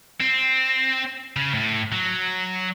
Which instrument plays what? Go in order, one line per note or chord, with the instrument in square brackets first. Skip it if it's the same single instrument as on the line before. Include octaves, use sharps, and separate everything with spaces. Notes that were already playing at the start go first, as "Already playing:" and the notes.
[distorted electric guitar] C4
C#3
A2
F#3